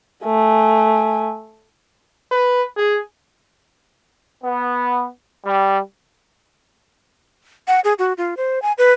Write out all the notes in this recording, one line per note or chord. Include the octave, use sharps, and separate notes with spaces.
A3 G#5
B4
G#4
B3
G3
F#5
G#4
F#4
F4
C5
G#5
B4